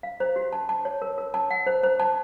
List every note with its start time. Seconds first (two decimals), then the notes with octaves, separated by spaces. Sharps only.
0.03 F5
0.20 C5
0.36 F#4
0.53 A5
0.69 A5
0.85 C#5
1.02 A#4
1.18 A#4
1.34 A5
1.51 F#5
1.67 C5
1.83 C5
2.00 A5